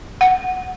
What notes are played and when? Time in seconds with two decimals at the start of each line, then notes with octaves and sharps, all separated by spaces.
0.21 F#5